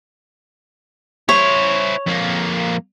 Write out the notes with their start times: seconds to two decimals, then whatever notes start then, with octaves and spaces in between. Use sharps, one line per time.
1.29 E4 C5 C#5
2.07 F2 A#3